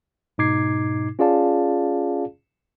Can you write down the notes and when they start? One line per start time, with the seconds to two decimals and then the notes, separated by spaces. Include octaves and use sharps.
0.38 G#2 B2 D#4 D6 G#6 C7
1.19 C#4 F4 G#4 D5 F5 A5